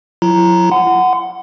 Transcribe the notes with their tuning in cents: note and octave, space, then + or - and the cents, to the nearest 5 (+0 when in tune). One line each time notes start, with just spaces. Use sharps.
F#3 -40 E4 +35 A#5 +0
F#5 +0 C6 -40